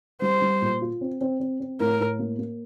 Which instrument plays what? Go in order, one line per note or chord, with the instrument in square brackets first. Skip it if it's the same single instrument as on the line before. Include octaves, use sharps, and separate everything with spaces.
[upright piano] G3 [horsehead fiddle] C5
[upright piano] G3
A#2
F4
C4
C4
C4
C4
[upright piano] A2 [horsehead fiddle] A#4
[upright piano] A2
A#3
A#3